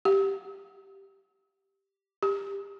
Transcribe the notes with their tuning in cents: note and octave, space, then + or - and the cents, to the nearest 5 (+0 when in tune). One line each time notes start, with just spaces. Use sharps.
G4 -5
G4 +20